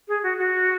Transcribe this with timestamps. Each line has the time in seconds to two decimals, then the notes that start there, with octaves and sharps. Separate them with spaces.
0.08 G#4
0.23 F#4
0.38 F#4